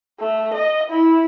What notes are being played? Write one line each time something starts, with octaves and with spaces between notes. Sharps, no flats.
A3
D#5
E4